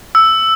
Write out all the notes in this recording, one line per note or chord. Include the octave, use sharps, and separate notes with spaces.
E6